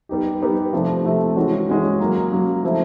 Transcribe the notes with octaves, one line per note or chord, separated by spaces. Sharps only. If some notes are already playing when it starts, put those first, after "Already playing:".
G3 B3 D#4 G4
G3 B3 D#4 G4
C3 F3 A3
C3 F3 A3
E3 G#3 C#4 F#4
E3 G#3 C#4 F#4
C#3 F#3 A#3
C#3 F#3 A#3
F3 A3 C4 E4